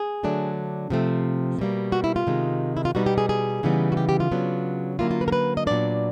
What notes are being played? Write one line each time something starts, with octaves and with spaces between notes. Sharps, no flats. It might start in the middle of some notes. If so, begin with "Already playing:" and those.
Already playing: G#4
D3 F#3 A3 D4
C3 F3 A3 C4
B2 G3 A#3
F#4
E4
F4
C3 D#3 G#3
E4
F4
B2 G3 B3 D#4 F#4
G4
G#4
G#4
C#3 E3 G3 B3 D#4
F#4
G4
G4
F4
C#3 F#3 B3 D4
D3 F#3 A#3 C#4 E4 F4
F4
B4
A#4
B4
D#5
A#2 F#3 B3 D4 D5